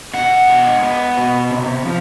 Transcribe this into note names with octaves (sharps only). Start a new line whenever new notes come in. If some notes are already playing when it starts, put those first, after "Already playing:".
B2 F#5
G#3
B3
B2
C3
F3